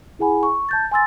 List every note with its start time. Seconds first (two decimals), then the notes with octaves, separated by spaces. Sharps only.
0.19 E4 G#4 F#5 G#5 B5
0.43 C#6
0.69 A5 G6 A6
0.91 G#5 C6 E6 A6